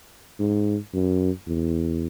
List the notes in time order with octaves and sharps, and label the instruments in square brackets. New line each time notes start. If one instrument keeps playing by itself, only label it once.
[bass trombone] G#2
F#2
E2